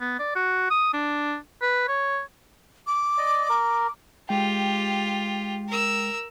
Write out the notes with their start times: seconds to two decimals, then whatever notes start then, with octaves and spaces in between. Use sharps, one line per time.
0.01 B3
0.19 D5
0.35 F#4
0.70 D#6
0.93 D4
1.62 B4
1.88 C#5
2.87 D6
3.18 D5 D#5
3.49 A#4
4.29 G#3 F4 G4 G5
5.68 A#4 E6